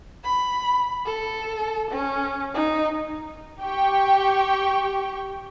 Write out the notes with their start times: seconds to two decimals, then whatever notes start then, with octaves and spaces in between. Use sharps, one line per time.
0.24 B5
1.06 A4
1.91 C#4
2.54 D#4
3.62 G4 G5 C#6